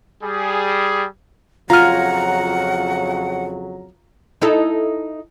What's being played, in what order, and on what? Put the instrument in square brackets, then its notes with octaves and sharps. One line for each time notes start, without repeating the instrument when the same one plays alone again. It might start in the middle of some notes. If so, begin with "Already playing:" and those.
[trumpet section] G3 G#4
[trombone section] F2 C#3 F#3 [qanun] F4 G#5 [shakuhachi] F#5 [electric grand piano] A#5 F6
[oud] D#4 E4 A4